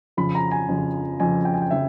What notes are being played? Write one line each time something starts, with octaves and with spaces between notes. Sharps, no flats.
F2 C#3 F3 B5
A#5
G#5
F2 C#3 F3
F2 C#3 F3 G#5
G5
G#5
G5
C#3 F3 E5